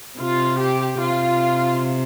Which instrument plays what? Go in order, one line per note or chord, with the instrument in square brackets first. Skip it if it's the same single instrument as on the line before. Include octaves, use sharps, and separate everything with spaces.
[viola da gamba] C3 [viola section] F4
[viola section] G4
[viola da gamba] C3 [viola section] F4